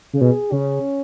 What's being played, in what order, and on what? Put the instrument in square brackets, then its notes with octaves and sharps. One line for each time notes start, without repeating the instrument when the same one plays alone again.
[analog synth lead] C#3
[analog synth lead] B2 [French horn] G#4
[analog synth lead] C#3 [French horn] C#4